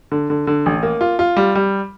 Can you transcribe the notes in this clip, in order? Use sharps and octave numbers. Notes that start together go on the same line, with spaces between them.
D3
D3
D3
A1
A#3
F4
F4
G3
G3